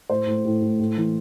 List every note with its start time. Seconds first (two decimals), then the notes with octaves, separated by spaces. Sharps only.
0.10 A2 C5
0.27 A2
0.45 A2
0.62 A2
0.80 A2
0.97 E3